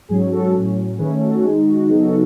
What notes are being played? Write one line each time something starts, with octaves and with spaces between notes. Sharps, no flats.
G#2 F#3 C#4 G#4
F#4 A4
A2 F#3 C#4
D#3 A3 C#4 G#4 B4
F#4 A4
D#3 G#3 D#4 G#4
F#4
C#3 F#3 B3 D#4 G#4
F#4 A4